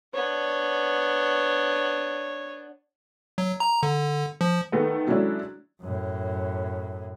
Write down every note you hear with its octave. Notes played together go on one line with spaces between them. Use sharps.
B3 D4 C#5
F#3
A#5
D3
F3
D#3 A3 B3
F#3 G#3 A3 C#4 D4 E4
F#2 A2